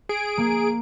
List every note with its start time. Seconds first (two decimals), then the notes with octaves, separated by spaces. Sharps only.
0.09 G#4 D7
0.38 A#3